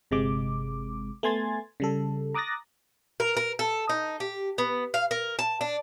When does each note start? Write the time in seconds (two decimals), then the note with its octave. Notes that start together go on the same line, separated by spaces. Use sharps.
0.11 G1 C3 G#3 D6
1.23 A3 B3 G#5 C6 G#6 A6
1.80 C#3 G3 A4
2.34 A#5 D6 D#6 F#6 A6 A#6
3.20 A#4
3.37 A#4
3.59 A4
3.89 D#4
4.20 G4
4.58 B3
4.94 F5
5.11 A#4
5.39 A5
5.61 D4